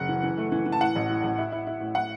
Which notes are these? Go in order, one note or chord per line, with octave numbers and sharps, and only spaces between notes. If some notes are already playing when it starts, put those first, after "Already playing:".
Already playing: F#1 F#5
E3
E3
A3
E3
E3
A5
A2 F#5
A1
A2
A1
E4
E4
E4
A2
A2 F#5